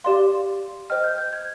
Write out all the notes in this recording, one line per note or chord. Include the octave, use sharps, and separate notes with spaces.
G4 D5 F5 C6
C5 D#5 G5 F6
G6
G6
G#6